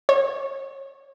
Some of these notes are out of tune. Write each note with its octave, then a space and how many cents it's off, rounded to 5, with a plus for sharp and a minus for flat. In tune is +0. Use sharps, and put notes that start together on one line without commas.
C#5 -25